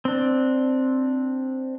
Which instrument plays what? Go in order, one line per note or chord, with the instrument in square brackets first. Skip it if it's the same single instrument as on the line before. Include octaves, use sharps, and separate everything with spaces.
[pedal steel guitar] C4 D4